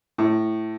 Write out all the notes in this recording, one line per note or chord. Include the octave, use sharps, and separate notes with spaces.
A2